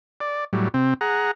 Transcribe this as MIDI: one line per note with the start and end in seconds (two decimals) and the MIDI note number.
0.21 0.44 74
0.53 0.68 45
0.53 0.68 54
0.53 0.68 55
0.74 0.94 48
0.74 0.94 60
1.01 1.31 68
1.01 1.31 78
1.01 1.31 82